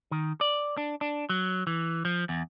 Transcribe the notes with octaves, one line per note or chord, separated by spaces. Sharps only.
D#3
D5
D4
D4
F#3
E3
F3
E2